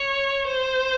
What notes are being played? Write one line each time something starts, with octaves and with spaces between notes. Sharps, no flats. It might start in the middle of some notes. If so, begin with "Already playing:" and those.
Already playing: C#5
C5